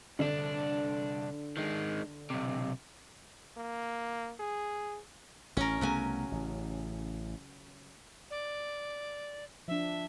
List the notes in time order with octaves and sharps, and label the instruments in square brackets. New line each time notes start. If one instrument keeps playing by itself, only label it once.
[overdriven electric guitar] C2 D4 [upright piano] D3 A4
[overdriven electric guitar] D#3 G#3
B1 C3
[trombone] A#3
G#4
[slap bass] A1 [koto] C#4 A#4
[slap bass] C2 A3 B3 [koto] C#3 F#3 G#5
[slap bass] A1
[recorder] D5
[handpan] F3 D4 [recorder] E5